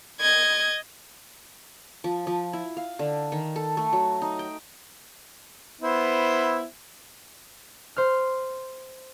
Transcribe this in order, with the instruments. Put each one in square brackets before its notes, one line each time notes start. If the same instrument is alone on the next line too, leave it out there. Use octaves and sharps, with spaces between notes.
[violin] D#5 G#6
[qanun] F3
F3
E4
F5
D3
D#3
A4
A3
F#3
D#4
G5
[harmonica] B3 E4 C5
[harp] C5 F6